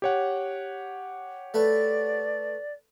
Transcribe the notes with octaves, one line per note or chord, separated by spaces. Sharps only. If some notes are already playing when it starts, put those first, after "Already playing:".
G4 C#5 F#5
A3 B4 D5